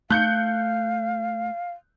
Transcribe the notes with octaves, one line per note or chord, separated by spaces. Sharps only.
A3 F5 F#6 G6 C#7